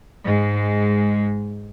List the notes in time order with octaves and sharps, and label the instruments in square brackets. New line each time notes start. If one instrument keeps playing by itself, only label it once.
[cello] G#2 G#3